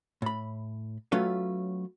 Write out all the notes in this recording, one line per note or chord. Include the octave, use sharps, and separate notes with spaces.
A2 B5
F#3 A3 C#4 F4 B4